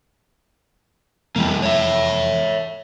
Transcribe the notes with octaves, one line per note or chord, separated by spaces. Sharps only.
F1 E2 E3 G3 A#3
C#5 E5